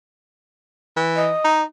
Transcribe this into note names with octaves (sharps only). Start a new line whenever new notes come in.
E3
D#5
D#4